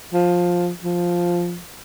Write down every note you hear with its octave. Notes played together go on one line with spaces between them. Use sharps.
F3
F3